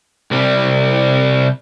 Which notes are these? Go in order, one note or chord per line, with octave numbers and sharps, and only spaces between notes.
C2 G3